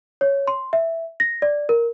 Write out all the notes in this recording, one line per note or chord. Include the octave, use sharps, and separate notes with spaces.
C#5
C6
E5
A#6
D5
A#4